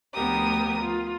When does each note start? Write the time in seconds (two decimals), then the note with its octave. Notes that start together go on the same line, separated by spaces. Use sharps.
0.13 D2 F3 B3 G4 A#4 D#6
0.81 F4